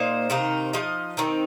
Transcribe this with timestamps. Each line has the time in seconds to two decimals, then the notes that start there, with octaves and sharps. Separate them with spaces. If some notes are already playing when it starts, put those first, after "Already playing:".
Already playing: A#2 A#3 D#4 C5
0.30 C3 D#3 A#3 D#4
0.73 F3 D#4 D#5
1.17 D#3 C4 D#4